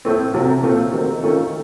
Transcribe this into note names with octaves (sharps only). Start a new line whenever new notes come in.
A2 A3 C4
C2 C3 F#3 C4
A#2 A3 C4 F4 A4
D#3 F#3 C4
D#3 A3 C#4 F4 A4